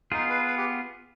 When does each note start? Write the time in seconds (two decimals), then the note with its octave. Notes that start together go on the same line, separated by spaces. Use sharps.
0.12 B3 D#4 F4 G#4
0.29 B4
0.47 B4
0.57 G4